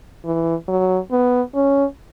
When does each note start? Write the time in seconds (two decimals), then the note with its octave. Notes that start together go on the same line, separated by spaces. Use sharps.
0.25 E3
0.68 F#3
1.11 B3
1.55 C#4